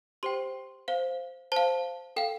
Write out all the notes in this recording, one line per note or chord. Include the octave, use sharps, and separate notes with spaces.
G4 C5 G5 C6
C5 F5
C5 F5 A5
A4 F5 G5